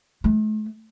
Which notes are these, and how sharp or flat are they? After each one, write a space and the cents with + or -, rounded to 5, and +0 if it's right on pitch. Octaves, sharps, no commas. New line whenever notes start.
A3 -40